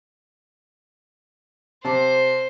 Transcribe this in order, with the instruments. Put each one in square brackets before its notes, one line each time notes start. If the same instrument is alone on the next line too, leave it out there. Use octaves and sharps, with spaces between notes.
[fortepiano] C3 A5 D6 [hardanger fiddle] C5